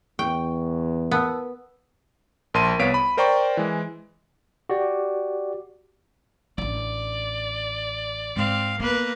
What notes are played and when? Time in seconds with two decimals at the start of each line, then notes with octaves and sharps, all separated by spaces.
0.19 E2 G5 C#6
1.11 B3 A#4 A5 E6
2.54 A#1 A#4 A5 C6 D#7
2.79 C2 B3 C#5 F5 B6 D7
2.94 B5
3.17 A#4 C5 D5 G5 A#5 C#6
3.57 E3 G#3
4.69 F#4 G4 D5
6.58 A1 D4 D5
8.36 G#2 C4 F5
8.80 A#3 B3 B4